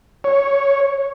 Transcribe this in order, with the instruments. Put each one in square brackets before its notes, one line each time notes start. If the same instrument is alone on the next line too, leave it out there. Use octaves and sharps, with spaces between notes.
[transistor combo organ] C#5